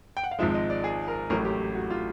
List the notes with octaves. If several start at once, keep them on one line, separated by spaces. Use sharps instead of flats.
G5
F#5
F5
G#1 G#2 F3 G#3 E5
D#5
D5
G#4
A#4
A1 A2 F#3 A3 A#4
G4
F#4
F4